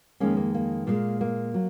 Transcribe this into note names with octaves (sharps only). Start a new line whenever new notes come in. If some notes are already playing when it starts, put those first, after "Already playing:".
F2 D#3 G#3 A#3 C#4
A#3
A#3
A#2 G#3 A#3
A#3
F#3